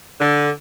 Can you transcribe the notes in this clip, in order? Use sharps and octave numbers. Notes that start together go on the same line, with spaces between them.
D3